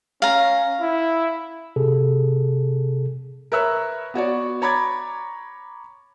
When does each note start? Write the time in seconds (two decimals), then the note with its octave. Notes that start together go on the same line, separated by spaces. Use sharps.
0.22 C#4 F5 A#5
0.80 E4
1.76 C3 G#4 A4
3.52 A#4 B4 C#5 E5 E6 F#6
4.14 B3 F#4 C#5 D5
4.62 C#5 A#5 B5 D6 G#6 A6